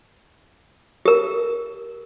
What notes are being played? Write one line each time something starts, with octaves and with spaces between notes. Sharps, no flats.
G4 A#4